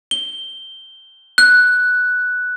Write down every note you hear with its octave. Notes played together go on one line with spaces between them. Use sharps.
G7
F#6